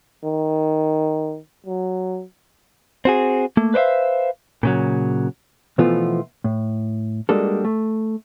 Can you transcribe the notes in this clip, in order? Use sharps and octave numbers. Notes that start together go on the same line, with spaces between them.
D#3
F#3
C4 F#4 G#4
A3 A#3
B4 C5 D5 E5 F5
A#2 C#3 F#3
B2 E3 F3 A3 B3 F4
A2
G3 G#3 A#3 D4 F#4 A4
A3